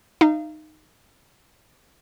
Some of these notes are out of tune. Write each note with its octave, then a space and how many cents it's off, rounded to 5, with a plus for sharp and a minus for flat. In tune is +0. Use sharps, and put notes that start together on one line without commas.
D#4 -10 F5 -35